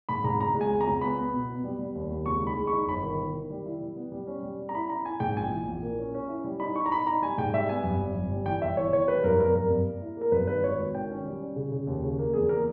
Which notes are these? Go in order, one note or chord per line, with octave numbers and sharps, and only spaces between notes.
G#2 B5
G#2 A#5
C#2 A#5
G#3
G#5
C#2
A#5
C#2
B3 B5
B3
B2
B3
G3
G3
D#2
D#2
C#2 C#6
D#4 B5
G#3
C#6
D#4
G1 B5
D#3
D#3
D#3
G3
E4
G3
B3
G3
C#4
G3
C#4
A#5
E4 B5
E4 A#5
E4 G#5
G#2 G5
A#1 G#5
E3
A#1
A#3
C#4
C#4
E4
G3
D#4 B5
D#4 C#6
A#5
D#4 B5
D#4 A#5
G3 G#5
G#2 G5
G3 E5
B3 G#5
G2
G1
G2
G3
E3 G5
G1 E5
E3 C#5
E3 C#5
G3 B4
G2 A#4
G2 A#4
G2 A#4
G2
A#3
E4
A#3 A#4
G2 B4
D#3 B4
G#1 C#5
G#1
D#3 G5
C#4
G3
C#4
C#3
C#3
D#2
C#3
A#3
E2 G#4
A#3 A#4